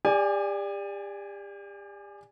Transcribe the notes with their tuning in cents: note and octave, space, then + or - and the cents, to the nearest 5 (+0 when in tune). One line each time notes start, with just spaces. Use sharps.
G4 +40 D5 +0 G#5 -5